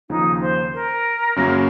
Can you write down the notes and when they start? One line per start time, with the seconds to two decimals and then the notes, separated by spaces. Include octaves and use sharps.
0.09 D#2 C#3 F3 D#4
0.41 C5
0.73 A#4
1.36 F#2 C#3 F#3 A#3 C#4